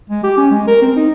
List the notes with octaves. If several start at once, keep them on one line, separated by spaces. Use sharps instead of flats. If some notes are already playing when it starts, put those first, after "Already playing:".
G#3
G4
C#4
G#3
A#4
C4
D#4